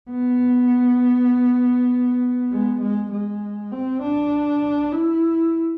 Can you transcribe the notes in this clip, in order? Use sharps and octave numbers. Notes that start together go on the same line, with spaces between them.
B3
G#3
G#3
G#3
C4
D4
E4